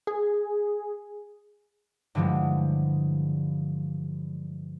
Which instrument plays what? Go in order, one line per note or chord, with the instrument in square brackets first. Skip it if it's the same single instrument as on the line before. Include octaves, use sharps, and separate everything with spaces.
[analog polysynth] G#4
[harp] G2 D3 E3 F3 G3 G#3